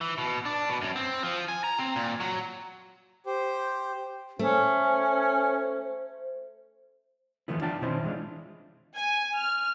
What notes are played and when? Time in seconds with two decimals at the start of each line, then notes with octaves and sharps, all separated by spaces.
0.01 E3
0.18 B2
0.45 D4
0.69 B2
0.81 F#2
0.96 C4
1.23 F3
1.48 G#5
1.64 A#5
1.79 C4
1.96 A#2
2.20 F#3
3.26 G4 C5
4.39 A3 C#4 C5
7.48 E3 F3 A3 B3 E4
7.61 D4 F4 G5 A5
7.82 B2 D#3 C4 C#4 E4 C5
8.04 E3 G#3 D4 F4
8.94 G#5
9.34 F6